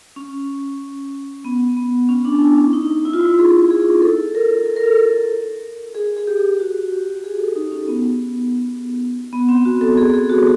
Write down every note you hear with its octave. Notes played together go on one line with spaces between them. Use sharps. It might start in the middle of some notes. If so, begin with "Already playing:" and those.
C#4
B3
B3
C#4
D4
E4
C#4
D#4
E4
F4
E4
G#4
G#4
A4
A#4
A4
A#4
A4
G#4
G#4
G4
F#4
G4
G#4
A4
D#4
C#4
B3
B3
C4
F#4
A4
G#4
G#4
F#4